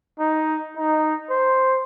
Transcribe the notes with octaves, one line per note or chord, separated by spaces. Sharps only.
D#4
D#4
C5